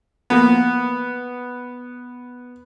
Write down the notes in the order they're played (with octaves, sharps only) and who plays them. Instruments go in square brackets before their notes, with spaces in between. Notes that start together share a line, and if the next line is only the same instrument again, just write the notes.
[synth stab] F3 A#3 [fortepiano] B3